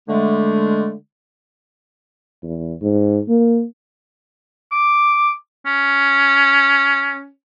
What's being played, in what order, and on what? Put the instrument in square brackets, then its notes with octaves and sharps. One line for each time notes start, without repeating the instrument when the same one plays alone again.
[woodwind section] D3 G#3 A3
[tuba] E2
G#2
A#3
[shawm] D6
C#4